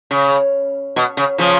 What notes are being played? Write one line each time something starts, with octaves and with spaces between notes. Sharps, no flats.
C#3
B2
C#3
C#3 F3